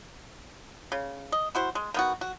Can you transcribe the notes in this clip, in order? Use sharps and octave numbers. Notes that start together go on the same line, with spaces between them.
C#3
D#5
E4 F#4 C5
G#3
D#3 B3 F#4
F#4